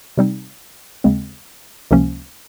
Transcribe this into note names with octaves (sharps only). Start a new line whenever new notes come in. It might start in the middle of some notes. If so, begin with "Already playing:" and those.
C3 G3 C4 D#4
D#2 C#3 G#3 C4
C#2 C3 F3 A#3 C#4